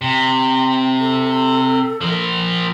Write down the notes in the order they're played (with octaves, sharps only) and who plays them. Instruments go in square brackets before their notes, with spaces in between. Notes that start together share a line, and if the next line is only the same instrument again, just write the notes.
[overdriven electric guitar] C3 [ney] G5
[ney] A4
[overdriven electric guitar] F3 A#4